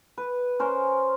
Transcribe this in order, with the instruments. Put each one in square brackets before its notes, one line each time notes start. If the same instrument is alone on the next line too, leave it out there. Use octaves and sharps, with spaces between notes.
[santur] B4
C#4 A#4 C5